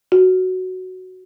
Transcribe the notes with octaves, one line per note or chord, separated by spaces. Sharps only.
F#4